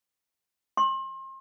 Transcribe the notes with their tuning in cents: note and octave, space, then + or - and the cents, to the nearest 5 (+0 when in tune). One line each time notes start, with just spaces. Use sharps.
C6 +35